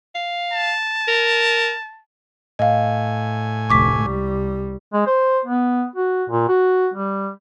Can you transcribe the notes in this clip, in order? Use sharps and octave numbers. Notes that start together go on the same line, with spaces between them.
F5
A5
A#4
A2 D#5 F5 G#5
F1 D2 C#6 D6 B6
C2 G3
G#3
C5
B3
F#4
A#2
F#4
G3